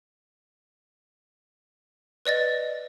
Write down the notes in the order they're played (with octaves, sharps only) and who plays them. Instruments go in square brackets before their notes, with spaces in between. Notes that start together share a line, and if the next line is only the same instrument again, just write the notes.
[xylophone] B4 D5 D#5 A6